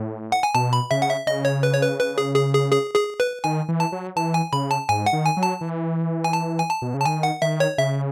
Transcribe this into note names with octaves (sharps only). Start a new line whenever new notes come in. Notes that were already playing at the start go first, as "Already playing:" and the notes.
Already playing: A2
F#5
G#5
B2 A5
B5
C#3 E5
F#5
E5
C#3 D#5
C#5
B4
C#5
B4
B4
G#4
G#4
G#4
G#4
G#4
B4
D#3 G#5
E3
A5
F#3
E3 A5
G#5
C#3 B5
A5
G#2 G#5
F#5
D#3
G#5
F#3
A5
E3
G#5
A5
G#5
A5
B2
C#3
A5
D#3 G#5
F#5
D#3 E5
C#5
C#3 E5